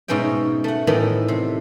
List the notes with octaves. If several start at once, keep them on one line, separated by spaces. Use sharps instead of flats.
G#2 B2 C#4 E5 G5
A3 F#5
A2 D#3 E3 B3 A4 D5
C3